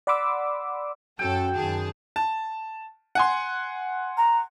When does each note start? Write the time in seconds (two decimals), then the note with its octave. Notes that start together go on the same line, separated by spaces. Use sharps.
0.07 D5 F#5 B5 C6 D6 E6
1.19 F#2 C#4 F#4 A4 G5
1.55 F#2 D#3 G#4 A5
2.16 A5
3.15 F#5 G#5 C6
4.18 A#5